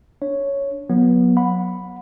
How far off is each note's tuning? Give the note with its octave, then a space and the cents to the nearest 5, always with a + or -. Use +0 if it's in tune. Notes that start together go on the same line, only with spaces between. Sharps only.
D4 -15 C#5 +0
F#3 -25 B3 -25
F#5 -25 B5 +0